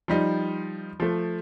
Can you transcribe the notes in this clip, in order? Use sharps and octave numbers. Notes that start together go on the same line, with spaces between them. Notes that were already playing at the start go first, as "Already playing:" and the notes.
F3 G3 D#4
F3 A3